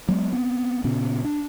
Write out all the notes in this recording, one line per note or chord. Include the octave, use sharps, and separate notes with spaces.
F#3 G#3 B3
B3 C4
A#2 C#3 B3 C#4
D4